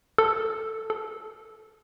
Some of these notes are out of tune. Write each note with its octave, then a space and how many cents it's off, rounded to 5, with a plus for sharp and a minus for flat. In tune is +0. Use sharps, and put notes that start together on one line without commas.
A4 +10
A4 -10